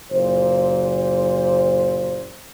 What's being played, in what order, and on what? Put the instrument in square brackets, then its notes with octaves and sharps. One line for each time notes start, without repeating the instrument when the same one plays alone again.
[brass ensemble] F#1 A#2 C5